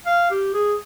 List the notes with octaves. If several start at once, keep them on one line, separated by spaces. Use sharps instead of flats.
F5
G4
G#4